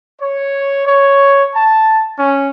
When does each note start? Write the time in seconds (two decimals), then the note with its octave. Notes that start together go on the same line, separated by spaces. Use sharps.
0.20 C#5
0.86 C#5
1.54 A5
2.17 C#4